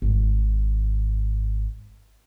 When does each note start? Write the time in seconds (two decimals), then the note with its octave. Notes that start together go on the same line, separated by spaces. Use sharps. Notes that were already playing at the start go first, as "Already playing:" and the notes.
0.02 G#1 G#2